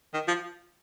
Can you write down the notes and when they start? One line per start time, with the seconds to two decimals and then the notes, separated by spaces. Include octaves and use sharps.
0.14 D#3
0.28 F3